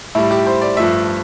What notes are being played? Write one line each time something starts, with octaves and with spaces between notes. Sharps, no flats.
A2 G3 E4
G4
C5
D5
G2 F3 A3 E5